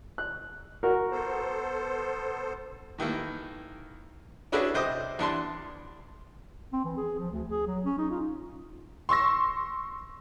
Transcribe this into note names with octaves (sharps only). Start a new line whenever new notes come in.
F#6
F#4 A#4
B3 A4 C5
A2 D#3 E3 A#3
C#4 D4 E4 F#4 G#4 B4
C3 C5 D#5 D6 D#6
E2 D4 A5 C6
C4
E3
G#4
F3
D2
G#4
F#3
C#4
D#4
F4
C6 C#6 E6 A#6